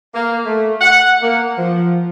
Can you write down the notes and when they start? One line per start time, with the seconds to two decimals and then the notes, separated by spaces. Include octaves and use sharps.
0.15 A#3
0.45 A3
0.81 F#5
1.22 A#3
1.57 F3